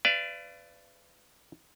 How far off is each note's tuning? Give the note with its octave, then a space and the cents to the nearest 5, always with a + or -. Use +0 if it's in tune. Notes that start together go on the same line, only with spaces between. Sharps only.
B4 +30 D5 +0 F5 -35